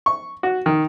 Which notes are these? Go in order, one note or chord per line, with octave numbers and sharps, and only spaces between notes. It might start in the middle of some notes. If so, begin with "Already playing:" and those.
C#6
F#4
D#3